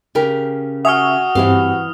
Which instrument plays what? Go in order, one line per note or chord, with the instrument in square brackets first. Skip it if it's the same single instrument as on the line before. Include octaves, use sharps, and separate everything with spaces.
[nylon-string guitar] C#3 G4 A#4
[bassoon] F#4 [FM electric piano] E5 G#5 C#6 [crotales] D#6 F6
[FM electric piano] G2 C4 G4 [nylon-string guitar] E3 B3 F5